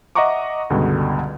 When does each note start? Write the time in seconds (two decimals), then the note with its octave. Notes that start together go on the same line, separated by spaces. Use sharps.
0.15 D#5 E5 F#5 A#5 C#6 D6
0.70 C#2 G2 B2 D3 G3 G#3